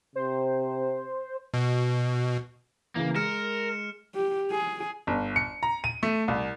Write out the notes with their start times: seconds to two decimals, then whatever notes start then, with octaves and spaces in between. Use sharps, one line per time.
0.16 C3 C5
1.54 B2
2.96 C#3 E3 A#3
3.15 G#3 A#4 F6 C#7 E7
4.15 G4
4.51 G#4
5.07 G1
5.36 C#7
5.63 A#5
5.84 D#7
6.03 A3
6.28 C2